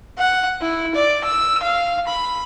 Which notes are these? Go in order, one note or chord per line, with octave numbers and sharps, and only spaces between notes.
F#5
E4
D5
E6
F5
B5